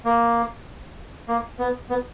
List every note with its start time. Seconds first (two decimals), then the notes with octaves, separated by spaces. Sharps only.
0.05 A#3
1.28 A#3
1.59 B3
1.90 B3